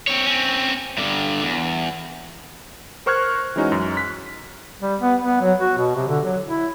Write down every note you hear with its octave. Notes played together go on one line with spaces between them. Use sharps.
C4 C#5
C4 C#4
G2 D3
E2
A#4 C5 C#6 F6 F#6 G#6
E3 G#3 C#4 D#4 F#4
F#2
F#6 B6
G3
B3
B3
F#3
F#4
B2
C3
D3
F#3
E4